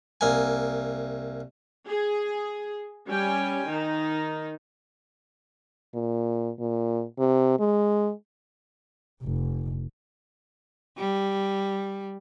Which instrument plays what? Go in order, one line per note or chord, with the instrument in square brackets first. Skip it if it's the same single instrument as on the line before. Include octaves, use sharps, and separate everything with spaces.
[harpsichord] C2 A#3 G#5
[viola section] G#4
G3 C#4 G5 G#5
D#3 D#4
[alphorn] A#2
A#2
C3
G#3
[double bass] F1
[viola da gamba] G3